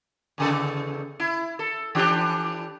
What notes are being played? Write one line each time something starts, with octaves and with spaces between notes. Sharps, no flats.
E2 C#3 A4
E4
A4
E3 D4 G4